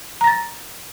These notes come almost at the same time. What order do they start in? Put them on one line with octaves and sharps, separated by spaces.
A#5 A#6 A6